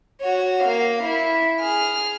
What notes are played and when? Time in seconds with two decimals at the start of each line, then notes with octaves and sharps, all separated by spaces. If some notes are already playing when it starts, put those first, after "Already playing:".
0.21 F#4 C#5
0.63 A#3 F5
1.03 E4
1.60 G#4 F6